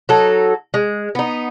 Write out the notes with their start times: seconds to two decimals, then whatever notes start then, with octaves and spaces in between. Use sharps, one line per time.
0.09 F#3 D#4 A4
0.74 G#3
1.15 B3 D#4